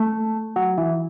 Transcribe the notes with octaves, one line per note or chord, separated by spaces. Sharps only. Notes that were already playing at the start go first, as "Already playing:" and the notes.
Already playing: A3
F#3
E3